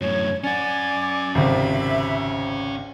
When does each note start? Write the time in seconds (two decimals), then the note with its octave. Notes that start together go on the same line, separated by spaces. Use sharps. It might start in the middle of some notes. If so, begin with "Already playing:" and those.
0.01 F#2 A2 C#5
0.44 C#4 D5 F#5 G#5 D6
1.35 G#1 C#2 C3 E5 B5